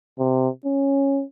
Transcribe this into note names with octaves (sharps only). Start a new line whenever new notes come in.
C3
C#4